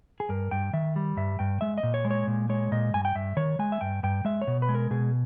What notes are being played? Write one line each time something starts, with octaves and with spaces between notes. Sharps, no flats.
G#4
G2 A#4
G2 G5
D#3 E5
G3
G2 E5
G2 G5
G#3 E5
D#5
A#2
C#5
G#3
C#5
A#2
G#3 C#5
A#2 D#5
G2 G#5
G5
G2 E5
D#3 C#5
G#3 G#5
E5
G2 G5
G2 G5
G#3 E5
C#5
B2
B4
G#3
A#4
B2 G#4